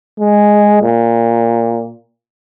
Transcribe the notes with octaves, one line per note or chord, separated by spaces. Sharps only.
G#3
A#2